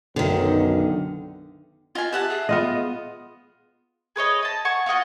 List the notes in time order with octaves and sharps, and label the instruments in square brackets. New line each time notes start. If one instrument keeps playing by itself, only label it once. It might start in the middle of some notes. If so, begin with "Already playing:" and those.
[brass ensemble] B1 F#2 [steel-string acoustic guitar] D3 D#3
[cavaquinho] F4 G#5 [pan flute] D#5
[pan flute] G4 [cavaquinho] E5 F#5 A5
[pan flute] G#4
[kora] B3 F4 D#5
[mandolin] G#4 B4 C#5 D#5
D#5 A5
F#5 G#5 C#6
F4 F#4 D#5 F#5